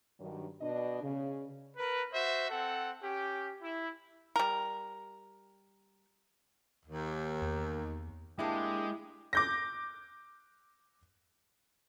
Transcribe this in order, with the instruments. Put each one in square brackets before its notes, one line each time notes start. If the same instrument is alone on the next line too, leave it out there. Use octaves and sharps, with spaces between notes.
[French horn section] G2 D#3 F#3
B2 D4 D#5
C#3
[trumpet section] A#4 B4
F#4 C5 E5
C4 A4 F#5
C#4 G4
E4
[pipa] G3 A#4
[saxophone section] D#2
[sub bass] E2
[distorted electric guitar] G#3 [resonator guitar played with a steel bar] A#3 D4 [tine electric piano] E4 [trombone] G4
[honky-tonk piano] D6 G6 A#6